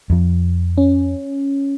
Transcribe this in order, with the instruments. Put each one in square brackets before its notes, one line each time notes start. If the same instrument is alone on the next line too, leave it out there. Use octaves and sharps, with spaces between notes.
[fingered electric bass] F2 F3
[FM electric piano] C#4